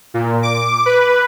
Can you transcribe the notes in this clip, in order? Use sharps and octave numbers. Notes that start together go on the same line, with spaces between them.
A#2
D6
B4